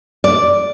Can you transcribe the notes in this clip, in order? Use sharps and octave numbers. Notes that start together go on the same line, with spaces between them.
D5